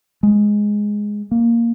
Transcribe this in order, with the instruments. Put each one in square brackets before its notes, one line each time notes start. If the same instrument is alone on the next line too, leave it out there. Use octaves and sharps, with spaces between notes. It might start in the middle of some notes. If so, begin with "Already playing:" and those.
[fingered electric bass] G#3
A#3